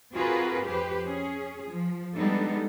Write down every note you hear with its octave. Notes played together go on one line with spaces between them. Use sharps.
C4 F4 F#4 G#4 A#4 B4
F2 G4 B4 C5
C#4 G#4
F3
G3 G#3 B3 D4 D#4 A4